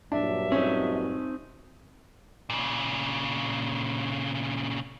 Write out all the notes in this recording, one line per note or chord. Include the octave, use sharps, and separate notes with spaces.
G2 A#2 F#3 D4 E5
C4 C#4 D#4
A#2 C#3